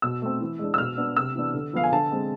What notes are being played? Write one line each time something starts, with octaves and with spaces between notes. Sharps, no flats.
B2 E6
A3 C4
E3
G#3 D4
E6
B2 F6
B3 D4
C3 E6
E3 B3 D4
D3
F3 B3 F5
G#5
D3 A5
G#3 C4